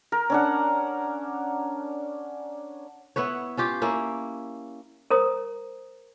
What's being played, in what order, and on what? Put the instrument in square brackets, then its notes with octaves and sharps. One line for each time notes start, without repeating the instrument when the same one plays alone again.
[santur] A#4
C#4 D4 F#5
[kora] B3 E4 B4 C#5
C#4 F4 G4
A#3 C#4 E4
[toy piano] A#4 C5 A#5 D#6